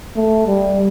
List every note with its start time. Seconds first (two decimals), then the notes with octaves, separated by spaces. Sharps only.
0.16 A3
0.47 G3